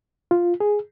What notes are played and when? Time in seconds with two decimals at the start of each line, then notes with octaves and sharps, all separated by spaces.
0.31 F4
0.60 G#4